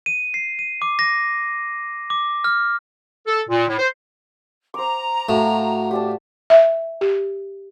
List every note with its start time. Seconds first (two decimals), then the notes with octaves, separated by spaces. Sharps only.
0.06 D#7
0.34 C7
0.59 D#7
0.82 D6
0.99 A#6
2.10 D6
2.44 F6
3.27 A4
3.49 A#2
3.68 A2
3.79 C5
4.74 C5 A#5 D6
5.29 A2 F#4 F5 G5
5.91 G4 D5 A5
6.50 E5
7.01 G4